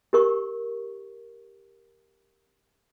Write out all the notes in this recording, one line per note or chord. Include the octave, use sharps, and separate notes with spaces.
G4 A#4 C#6